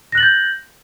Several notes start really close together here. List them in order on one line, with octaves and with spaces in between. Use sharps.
A#6 F#6 F#7 A6 G6